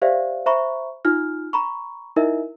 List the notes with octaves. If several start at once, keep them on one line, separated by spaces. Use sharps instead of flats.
G4 C5 D5 E5 F5
C5 E5 A#5 B5 C#6
D#4 F4 F6
A#5 B5 C#6
D#4 E4 A#4 D#5 E5